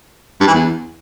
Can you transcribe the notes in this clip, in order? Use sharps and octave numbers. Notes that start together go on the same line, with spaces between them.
G2
E3
E2